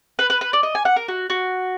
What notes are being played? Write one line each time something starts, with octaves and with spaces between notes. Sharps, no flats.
B4
B4
B4
D5
D#5
G#5
F#5
A#4
F#4
F#4